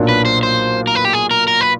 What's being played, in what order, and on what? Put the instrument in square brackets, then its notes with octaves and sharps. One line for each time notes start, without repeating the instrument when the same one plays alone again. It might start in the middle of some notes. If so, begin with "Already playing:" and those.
Already playing: [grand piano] B1 A#2 F#3 A#3 D4
[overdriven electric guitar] B4
C5
C5
A#4
B4
G4
G#4
A#4
A#4
B4